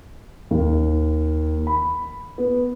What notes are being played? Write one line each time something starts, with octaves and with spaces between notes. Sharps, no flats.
D#2
B5
B3